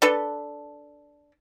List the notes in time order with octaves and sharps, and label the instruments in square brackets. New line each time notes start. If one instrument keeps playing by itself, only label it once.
[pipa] D4 A4 B4